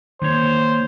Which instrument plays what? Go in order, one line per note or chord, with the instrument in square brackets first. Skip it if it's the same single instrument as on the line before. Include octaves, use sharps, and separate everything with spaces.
[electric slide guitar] D#3 A#3 C#5 [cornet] C5